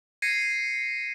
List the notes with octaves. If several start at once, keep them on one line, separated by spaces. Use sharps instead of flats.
G#6 A#6 C7 C#7 D#7